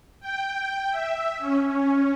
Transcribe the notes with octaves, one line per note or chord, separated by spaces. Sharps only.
G5
E5
C#4
C#4